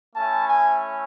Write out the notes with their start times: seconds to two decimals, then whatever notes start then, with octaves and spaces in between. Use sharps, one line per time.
0.15 A3 C#4 E4 A5
0.48 G#5